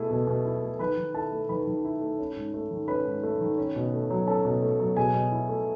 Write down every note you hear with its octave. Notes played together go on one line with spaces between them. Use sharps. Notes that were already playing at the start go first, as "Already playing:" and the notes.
Already playing: B2 A3 E4 G#4
B2
B2
E4
A3
D#3 B4 B5
D#3
E4 A4 A5
A3
D#3 B4 B5
D#3
E4
A3
C#4
G#2
A3
D#3
C#4 B4 B5
G#2
A3
D#3
C#4
B2
A3
F#3
C#4 A4 A5
B2
A3
F#3
B2 G#4 G#5
B2
E4
A3